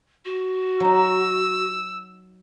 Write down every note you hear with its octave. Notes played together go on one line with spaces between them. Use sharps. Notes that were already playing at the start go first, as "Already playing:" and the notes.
F#4
F#3 D#4 E6